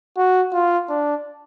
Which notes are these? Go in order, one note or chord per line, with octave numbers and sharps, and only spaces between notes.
F#4
F4
D4